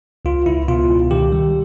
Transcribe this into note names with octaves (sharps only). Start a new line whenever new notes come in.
C#2 F4
C#2 E4
B2 F4
C#2
D#3 G4
G3